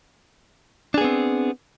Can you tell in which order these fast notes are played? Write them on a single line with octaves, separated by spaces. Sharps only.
D4 G#4 B3 C4